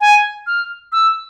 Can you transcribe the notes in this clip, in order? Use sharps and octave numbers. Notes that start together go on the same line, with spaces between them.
G#5
F6
E6